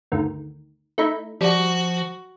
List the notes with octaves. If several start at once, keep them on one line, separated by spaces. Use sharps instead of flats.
G1 D2 D#3
A3 D#4 E4
F3 G3 F#4